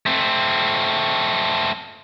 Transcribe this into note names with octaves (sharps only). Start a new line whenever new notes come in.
A3 C4